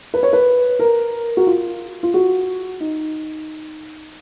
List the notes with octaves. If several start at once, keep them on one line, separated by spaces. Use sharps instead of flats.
B4
C#5
B4
A#4
F#4
F4
F4
F#4
D#4